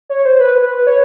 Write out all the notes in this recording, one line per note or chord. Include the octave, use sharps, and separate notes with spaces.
C#5
C5
B4
B4
C#5